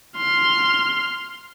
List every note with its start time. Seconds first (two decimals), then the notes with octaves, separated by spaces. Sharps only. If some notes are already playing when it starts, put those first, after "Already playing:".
0.17 C6 F6